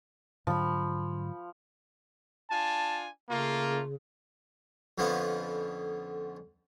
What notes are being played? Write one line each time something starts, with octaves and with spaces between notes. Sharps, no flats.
G#2 D3 F3 F#3 B5
D4 F4 G#5 A5
C#3 A3 A#3 F4
F2 D3 F3 B3 C#4 B4